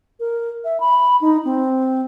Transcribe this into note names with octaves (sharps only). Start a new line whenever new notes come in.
A#4
E5
B5
D#4
C4